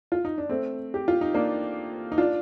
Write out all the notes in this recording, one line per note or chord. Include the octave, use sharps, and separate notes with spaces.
F4
D#4
D4
A3 C4
G4
F4
D#4
A#3 D4
D#4
D4 F4